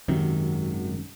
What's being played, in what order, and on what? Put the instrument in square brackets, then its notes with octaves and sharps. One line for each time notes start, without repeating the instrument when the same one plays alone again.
[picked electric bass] G#1 F#2 C3 D#3